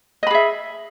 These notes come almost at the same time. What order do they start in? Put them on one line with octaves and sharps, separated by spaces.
D#5 B5 G#4 E5